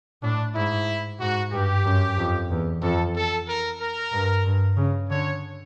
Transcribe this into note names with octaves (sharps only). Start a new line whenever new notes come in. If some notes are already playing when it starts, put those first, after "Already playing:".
A2 D4
G#2 E4
G#2 F#4
G2 G4
F#2
F2
E2
F2 A4
A4
A#4
A#4
G2
G2
C#3
D3 C#5